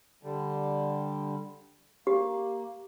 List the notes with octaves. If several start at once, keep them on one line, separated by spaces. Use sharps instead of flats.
D3 G3
A#3 G4